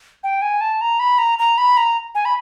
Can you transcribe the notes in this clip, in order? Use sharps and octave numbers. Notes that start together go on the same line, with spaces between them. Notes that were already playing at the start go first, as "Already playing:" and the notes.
G5
G#5
A5
A#5
B5
A#5
A#5
B5
A#5
G#5
B5